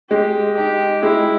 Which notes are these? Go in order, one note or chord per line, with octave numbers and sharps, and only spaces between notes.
G#3 G4
D#4 G4
G#3 E4